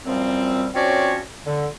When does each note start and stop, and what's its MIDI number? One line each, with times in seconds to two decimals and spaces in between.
0.06 0.68 42
0.06 0.68 46
0.06 0.68 53
0.06 0.68 55
0.06 0.68 60
0.74 1.20 53
0.74 1.20 60
0.74 1.20 61
0.74 1.20 66
0.74 1.20 73
0.74 1.20 74
1.45 1.66 50